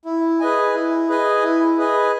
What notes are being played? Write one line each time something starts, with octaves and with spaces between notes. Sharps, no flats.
E4
G#4 B4 D#5 G#5
E4
G#4 B4 D#5 G#5
E4
G#4 B4 D#5 G#5